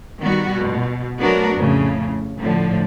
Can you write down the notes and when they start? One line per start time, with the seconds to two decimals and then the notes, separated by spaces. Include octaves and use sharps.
0.20 D#3 G3 B3 F#4
0.51 B2
1.20 F#3 A3 B3 D4 F#4 A#4
1.56 F2 A2 C#3
2.39 A2 D3 F3